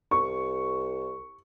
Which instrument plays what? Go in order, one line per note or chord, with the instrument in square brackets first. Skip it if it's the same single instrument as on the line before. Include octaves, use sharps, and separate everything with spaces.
[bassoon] C2 [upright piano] C#6